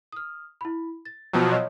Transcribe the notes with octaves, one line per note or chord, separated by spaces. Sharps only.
D#6 F6
E4 B5
A6
B2 F3 F#3 G5 A5
C#5 D#5 F5